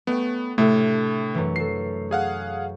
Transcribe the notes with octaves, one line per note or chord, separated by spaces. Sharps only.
A3 B3 C#4 G5
A2 C3 A3 D4 A4
F#2 E3
F#4 A4 C7
G#4 F5 F#5